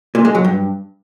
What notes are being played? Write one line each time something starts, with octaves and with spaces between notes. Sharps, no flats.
A#2
G#3
F#3
G2